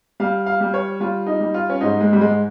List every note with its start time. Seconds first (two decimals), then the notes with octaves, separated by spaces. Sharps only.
0.20 G3 F5
0.46 F5
0.60 G3
0.74 C#5
1.00 G3 F4
1.27 D#4
1.40 G3
1.54 F4
1.70 C#4
1.81 G#2 D#4
2.00 G#3
2.13 G3
2.21 G#2 G#3